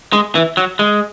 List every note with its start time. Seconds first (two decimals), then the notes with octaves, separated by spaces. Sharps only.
0.13 G#3
0.35 E3
0.57 F#3
0.79 G#3